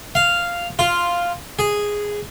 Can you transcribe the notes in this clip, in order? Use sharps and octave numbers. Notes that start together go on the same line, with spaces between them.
F5
F4
G#4